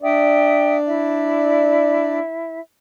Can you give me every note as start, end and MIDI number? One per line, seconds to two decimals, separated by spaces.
0.02 2.19 62
0.02 2.19 74
0.02 0.75 76
0.02 0.75 79
0.02 0.75 87
0.87 2.59 64
0.87 2.59 76